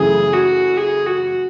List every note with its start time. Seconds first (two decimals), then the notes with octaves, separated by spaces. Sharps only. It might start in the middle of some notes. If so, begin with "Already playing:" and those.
Already playing: F#2 C#3 E3 A3 G#4
0.33 F#4
0.77 G#4
1.06 F#4